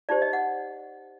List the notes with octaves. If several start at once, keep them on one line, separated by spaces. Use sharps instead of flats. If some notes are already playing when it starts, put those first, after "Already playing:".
D#4 G4 C5 D5
D#5
F#5